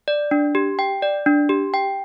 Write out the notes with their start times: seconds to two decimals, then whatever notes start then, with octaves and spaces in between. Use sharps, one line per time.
0.08 D5
0.31 D4
0.55 G4
0.79 G5
1.02 D5
1.26 D4
1.49 G4
1.74 G5